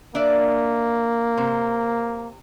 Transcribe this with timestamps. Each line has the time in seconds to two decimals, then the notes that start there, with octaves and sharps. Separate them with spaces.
0.15 A#3 D4 D5 E5
1.37 C3 C5